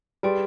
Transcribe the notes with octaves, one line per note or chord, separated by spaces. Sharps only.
G3 G#4 B4 D5 G5 C6